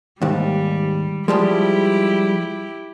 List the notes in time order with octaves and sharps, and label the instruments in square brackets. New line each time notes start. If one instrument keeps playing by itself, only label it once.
[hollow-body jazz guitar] D#2 G#2 [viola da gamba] G3
[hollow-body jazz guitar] F3 G3 G#3 [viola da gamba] E4 G4